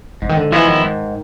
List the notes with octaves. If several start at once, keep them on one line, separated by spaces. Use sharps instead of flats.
G#2 D3
D#3
D3
E3 F3 G#3 B3 E4
D#3
G#2